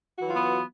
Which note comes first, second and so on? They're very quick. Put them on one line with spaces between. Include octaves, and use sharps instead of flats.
F#4 E3 F#3 F4 B3